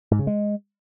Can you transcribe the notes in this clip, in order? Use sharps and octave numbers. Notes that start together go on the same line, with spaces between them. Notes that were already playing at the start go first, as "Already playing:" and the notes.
G#2
C#3
G#3